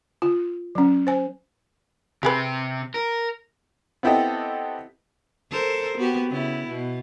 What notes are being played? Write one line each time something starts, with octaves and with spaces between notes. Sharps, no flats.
F4
F#3 C#4
C5 G#5
C3 G4 G#4 B4 C5
A#4
B3 C4 E4 G4 A4 D#5
A4 A#4 C5
B3 F#4 G4
C#3 B3 E4
B2